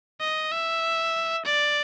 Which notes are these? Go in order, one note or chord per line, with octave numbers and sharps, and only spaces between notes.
D#5
E5
D5